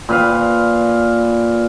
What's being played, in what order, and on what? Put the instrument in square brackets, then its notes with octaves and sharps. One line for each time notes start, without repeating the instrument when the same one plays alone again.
[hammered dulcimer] A#2 B4 F5